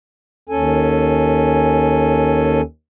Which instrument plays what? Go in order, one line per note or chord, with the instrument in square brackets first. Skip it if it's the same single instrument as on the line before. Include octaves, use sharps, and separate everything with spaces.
[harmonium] D#2 C#4 A4 G#5